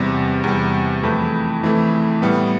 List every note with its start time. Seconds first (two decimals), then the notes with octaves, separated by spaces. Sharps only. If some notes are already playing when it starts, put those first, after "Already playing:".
Already playing: E2 C3 G3
0.44 E2 C3 G3
1.03 F2 E3 A3 E4
1.63 F2 E3 A3 E4
2.22 A2 G3 B3